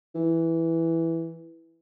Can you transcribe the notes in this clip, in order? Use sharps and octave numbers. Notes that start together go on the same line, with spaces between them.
E3